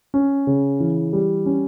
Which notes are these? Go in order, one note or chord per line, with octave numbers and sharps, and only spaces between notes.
C#4
C#3
E3
G3
C#4